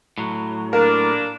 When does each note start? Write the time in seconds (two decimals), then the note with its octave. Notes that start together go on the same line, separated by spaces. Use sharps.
0.18 A2 F#3
0.73 A#3 D4 A#4